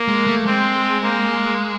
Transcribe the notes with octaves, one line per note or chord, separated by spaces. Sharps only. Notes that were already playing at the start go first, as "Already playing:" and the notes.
Already playing: A#3
G#3
A3
G#3 C4
A#3